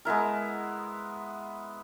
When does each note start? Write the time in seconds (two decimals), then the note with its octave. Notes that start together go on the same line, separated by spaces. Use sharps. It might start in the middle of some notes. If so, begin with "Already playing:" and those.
0.05 G#3 B3 E4 A#4